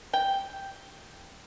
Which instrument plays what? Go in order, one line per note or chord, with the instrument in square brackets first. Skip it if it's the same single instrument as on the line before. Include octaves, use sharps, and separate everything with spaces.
[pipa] G5